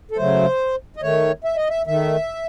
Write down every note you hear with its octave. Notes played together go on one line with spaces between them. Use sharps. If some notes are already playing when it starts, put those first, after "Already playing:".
A4
C#3 F#3 A3 C5
D#5
D#3 A3 C#5
E5
D#5
E5
D#3 A3 E5